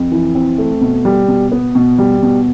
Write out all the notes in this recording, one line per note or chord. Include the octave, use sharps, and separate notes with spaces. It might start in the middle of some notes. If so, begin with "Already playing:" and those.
Already playing: F2
E3
C4
A3
B2
G3
B2
B3
B2
G3
B2